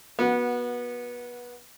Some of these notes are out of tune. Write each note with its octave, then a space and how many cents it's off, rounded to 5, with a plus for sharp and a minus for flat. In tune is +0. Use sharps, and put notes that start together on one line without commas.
B3 -25 F#4 -10